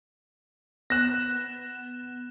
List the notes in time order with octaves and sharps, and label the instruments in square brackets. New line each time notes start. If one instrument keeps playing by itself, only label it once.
[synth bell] B3 E7 [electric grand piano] F#6 A#6